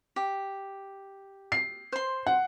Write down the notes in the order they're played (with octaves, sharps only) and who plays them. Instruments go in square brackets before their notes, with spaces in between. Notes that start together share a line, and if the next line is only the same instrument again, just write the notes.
[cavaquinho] G4
[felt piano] C7
[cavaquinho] C5 C6
[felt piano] F#5